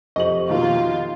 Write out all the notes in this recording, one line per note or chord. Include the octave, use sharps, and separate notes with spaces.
F1 C4 G4 D#5 C#6 F#7
B2 D#3 A#3 F4